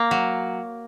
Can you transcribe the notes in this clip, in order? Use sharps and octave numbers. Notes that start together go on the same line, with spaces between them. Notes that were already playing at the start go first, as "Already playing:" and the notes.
Already playing: A#3
F#3